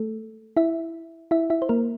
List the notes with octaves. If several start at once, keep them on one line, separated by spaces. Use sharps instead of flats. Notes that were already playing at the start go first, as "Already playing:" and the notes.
Already playing: A3 A4
E4 E5
E4 E5
E4 E5
C5
A#3 A#4